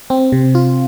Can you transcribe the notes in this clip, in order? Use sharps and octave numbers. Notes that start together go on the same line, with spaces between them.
C4
C3
F4